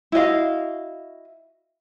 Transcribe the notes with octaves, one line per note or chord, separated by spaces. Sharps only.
E4 F#4 D#5 F5